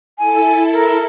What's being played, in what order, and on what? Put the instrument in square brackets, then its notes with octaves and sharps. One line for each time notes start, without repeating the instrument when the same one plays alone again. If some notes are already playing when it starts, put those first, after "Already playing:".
[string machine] E4 A4 [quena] G#5
[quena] A#4